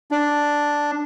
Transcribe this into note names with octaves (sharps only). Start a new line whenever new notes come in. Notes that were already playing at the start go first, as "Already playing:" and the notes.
D4